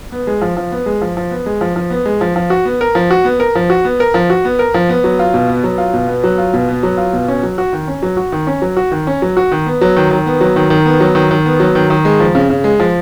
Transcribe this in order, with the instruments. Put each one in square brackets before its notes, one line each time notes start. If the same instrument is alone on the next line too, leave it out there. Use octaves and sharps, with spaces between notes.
[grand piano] B3
G#3
F3
F3
B3
G#3
F3
F3
B3
G#3
F3
F3
B3
G#3
F3
F3
F#4
B3
A#4
F3
F#4
B3
A#4
F3
F#4
B3
A#4
F3
F#4
B3
A#4
F3
B3
F#3
F4
B2
B3
F#3
F4
B2
B3
F#3
F4
B2
B3
F#3
F4
B2
C#4
F#3
F#4
D#3
C#4
F#3
F#4
D#3
C#4
F#3
F#4
D#3
C#4
F#3
F#4
D#3
B3
F#3
D#3
D#3
B3
F#3
D#3
D#3
B3
F#3
D#3
D#3
B3
F#3
D#3
D#3
G#3
F3
C#3
C#3
G#3
F3